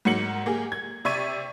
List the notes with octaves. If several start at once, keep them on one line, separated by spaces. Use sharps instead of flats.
G#2 F#3 A#3 C#7 F#7
A#3 G4 G#4
G#6
C3 D5 E5 C#6 G#6 D#7